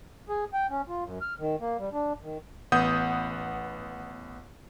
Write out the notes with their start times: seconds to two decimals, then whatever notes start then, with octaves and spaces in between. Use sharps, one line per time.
0.29 G#4
0.53 G5
0.70 C#4
0.88 F4
1.04 F#2
1.21 F6
1.39 D#3
1.61 A#3
1.79 G3
1.93 D4
2.23 D#3
2.72 A1 B3 F#5 D#6 G6